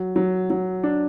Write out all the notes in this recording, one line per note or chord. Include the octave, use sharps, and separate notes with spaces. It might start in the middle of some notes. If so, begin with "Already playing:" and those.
Already playing: F#3
F#3
F#3
D4